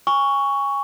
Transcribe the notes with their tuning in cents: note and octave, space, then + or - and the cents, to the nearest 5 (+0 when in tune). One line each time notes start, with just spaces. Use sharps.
G#5 -25 C#6 +10